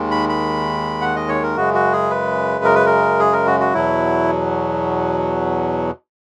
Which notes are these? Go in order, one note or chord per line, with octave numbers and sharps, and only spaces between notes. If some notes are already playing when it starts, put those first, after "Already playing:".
Already playing: D#2 D#3 G#3
B5
B5
F#5
D#5
C#5
A#4
F#2 C#3 G#3 F#4
F#4
G#4
B4
A#4
B4
A#4
G#4
A#4
F#4
F#4
E2 B2 F#3 E4